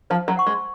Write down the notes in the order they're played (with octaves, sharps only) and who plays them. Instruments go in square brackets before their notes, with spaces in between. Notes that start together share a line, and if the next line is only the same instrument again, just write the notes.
[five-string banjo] F3 [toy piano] C5
[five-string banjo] F#3
[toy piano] F#5 C#6
[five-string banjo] G#3